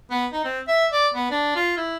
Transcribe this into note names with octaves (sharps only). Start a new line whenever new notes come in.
B3
D#4
C4
E5
D5
B3
D4
F4
E4